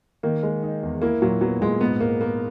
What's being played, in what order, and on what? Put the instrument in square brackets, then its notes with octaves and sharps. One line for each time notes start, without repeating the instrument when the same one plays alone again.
[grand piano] D#3 [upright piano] A#3
[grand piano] G#3
D#4
E2
[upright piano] A#3 [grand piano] E4
[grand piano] A#2 [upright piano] F#3
[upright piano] F#3 [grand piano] B3
[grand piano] A#2 [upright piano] G#3
[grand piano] G#2 [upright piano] B3
[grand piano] G#2 [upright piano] A#3
[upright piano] A#3 [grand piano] B3